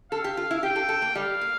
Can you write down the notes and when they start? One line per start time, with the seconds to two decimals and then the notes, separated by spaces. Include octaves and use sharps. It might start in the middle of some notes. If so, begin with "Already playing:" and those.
0.11 A4 F5
0.24 G4
0.37 F4
0.51 E4
0.63 G4 G5
0.76 A4
0.89 A4
1.02 A#3
1.15 G3 F5
1.41 A#3